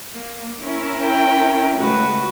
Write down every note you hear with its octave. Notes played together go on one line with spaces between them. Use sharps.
A#3
C#4 E4 A#4
G5
C#3 G#3 A3 F#4 B4